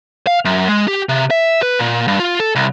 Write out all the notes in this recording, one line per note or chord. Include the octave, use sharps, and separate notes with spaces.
F5
F#2
G#3
G4
C3
E5
B4
A#2
G2
F4
A4
C2